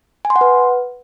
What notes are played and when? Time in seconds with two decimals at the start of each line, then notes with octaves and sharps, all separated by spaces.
0.25 G#5
0.30 C6
0.36 F#5
0.41 B4